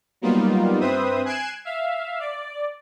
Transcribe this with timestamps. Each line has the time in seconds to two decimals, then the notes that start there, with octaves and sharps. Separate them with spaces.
0.22 F#3 G3 A#3 B3 D#4 F4
0.80 G2 C4 B4 C5 E5 D#6
1.25 G#5 F#6 G#6 C7 D7 E7
1.65 E5 F5
2.20 D5